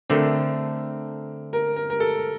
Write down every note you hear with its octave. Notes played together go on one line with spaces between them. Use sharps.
D3 A3 C4 A#4
A#4
A#4
A#4
A4